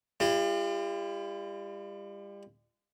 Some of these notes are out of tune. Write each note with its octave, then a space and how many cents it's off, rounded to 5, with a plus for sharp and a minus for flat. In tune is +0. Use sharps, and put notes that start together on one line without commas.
G3 +35 F4 -35